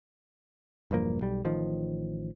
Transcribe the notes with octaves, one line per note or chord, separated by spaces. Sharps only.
E1 G2 F3 A#3
B1 G3
A1 D#3 F3